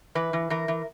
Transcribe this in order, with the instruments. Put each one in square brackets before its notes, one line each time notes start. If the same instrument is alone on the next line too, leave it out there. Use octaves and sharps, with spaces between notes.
[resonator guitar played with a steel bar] E3 B4
E3
E3 A#4
E3